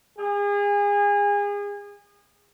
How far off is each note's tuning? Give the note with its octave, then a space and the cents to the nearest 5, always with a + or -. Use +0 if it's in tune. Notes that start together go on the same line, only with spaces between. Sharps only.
G#4 -30